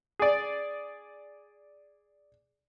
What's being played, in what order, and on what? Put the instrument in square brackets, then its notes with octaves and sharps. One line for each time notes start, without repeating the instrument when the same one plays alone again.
[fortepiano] G#4 D5